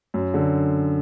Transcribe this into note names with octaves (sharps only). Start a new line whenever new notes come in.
F#2
D3